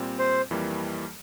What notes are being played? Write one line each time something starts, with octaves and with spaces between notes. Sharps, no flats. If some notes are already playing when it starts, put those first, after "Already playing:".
Already playing: A#2 G3 C4
C5
F2 E3 G3 A#3